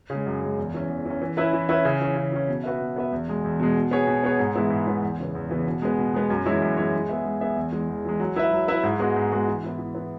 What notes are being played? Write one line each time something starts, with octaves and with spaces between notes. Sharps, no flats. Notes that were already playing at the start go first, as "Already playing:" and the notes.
C#3
G#3
F#2
C#3 G#3
E2
E3 C#4
E2
E3
C#4
E3
C#4 E4 B4 E5
E3
C#4 E4 B4 E5
C#3
E3 C#4
C#3
E3 C#4
B2
B3 F#4 B4 E5
B2
B3 F#4 B4 E5
E2
B2 G#3
E2
B2 G#3
B2
B3 G#4 C#5
B2
B3 G#4 C#5
G#2
E3 G#3 B3 E4
G#2
E3 G#3 B3 E4
E2
C#3 E3 B3
E2
C#3 E3 B3
B2
G#3 B3
B2
G#3 B3
F#2
E3 G#3 E4 C#5
F#2
E3 G#3 E4 C#5
G#3
B3 G#4 E5
G#3
B3 G#4 E5
E2
E3 G#3
E2
E3 G#3
F#3
E4 B4 E5
F#3
E4 B4 E5
G#2
G#3 B3 F#4
G#2
G#3 B3 F#4
E3
B3 E4
E3
B3 E4